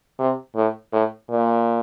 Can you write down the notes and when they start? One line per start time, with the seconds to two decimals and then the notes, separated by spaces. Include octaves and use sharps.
0.19 C3
0.56 A2
0.92 A2
1.30 A#2